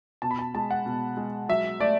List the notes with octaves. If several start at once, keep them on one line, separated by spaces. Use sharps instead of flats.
B2 A5
B5
A5
G#3 A5
F#5
B2
G#3
F#3 E5
A3 D5